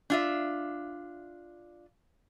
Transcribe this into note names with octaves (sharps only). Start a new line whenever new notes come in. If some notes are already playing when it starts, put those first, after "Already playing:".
D4 F4 E5